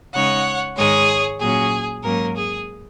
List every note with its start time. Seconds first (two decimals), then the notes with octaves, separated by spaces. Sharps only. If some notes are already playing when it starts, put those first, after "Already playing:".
0.13 C#3 G#3 D#4 C#5 F#5
0.77 G#2 D#3 G#3 G#4 C#5
1.41 A#2 F#3 C#4 G#4
2.03 G#2 F#3 A#3 C#4 A#4
2.36 G#4